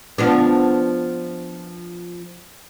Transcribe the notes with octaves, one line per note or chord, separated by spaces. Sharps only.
F3 B3 D4